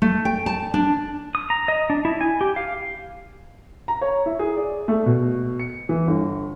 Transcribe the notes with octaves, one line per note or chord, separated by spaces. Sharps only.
A3
G5
A5
D4
D#6
A#5
D#5
D4
E4
G#5
G4
F5
A#5
C#5
E4
G#4
D5
A3
B2
C#7
E3
G1